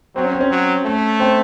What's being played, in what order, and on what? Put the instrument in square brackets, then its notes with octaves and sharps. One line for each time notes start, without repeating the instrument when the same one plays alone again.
[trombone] F#3 [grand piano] C4
[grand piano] C#4
C4
C#4
[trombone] F#3
A3
[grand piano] C4